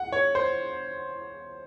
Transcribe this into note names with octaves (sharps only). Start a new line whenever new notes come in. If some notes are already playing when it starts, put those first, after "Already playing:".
Already playing: F#5
C#5
C5